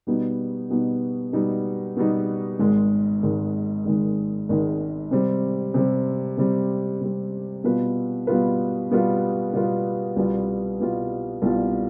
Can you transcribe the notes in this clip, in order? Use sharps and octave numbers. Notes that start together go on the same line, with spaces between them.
B2 G3 B3 D#4
B2 G3 B3 D#4
B2 G3 B3 D#4
B2 G3 B3 D#4
G#1 G#2 D#3 G#3
G#1 G#2 D#3 G#3
G#1 G#2 D#3 G#3
G#1 G#2 D#3 G#3
C3 G3 C4
C3 G3 C4
C3 G3 C4
C3 G3 C4
B2 G3 B3 F4 B4
B2 G3 B3 F4 B4
B2 G3 B3 F4 B4
B2 G3 B3 F4 B4
C2 B2 G3 B3 F4
C2 B2 G3 B3 F4
C2 B2 G3 B3 F4